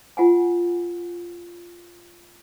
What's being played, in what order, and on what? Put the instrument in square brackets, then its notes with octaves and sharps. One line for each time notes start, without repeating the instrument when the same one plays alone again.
[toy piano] F4 F#5 G#5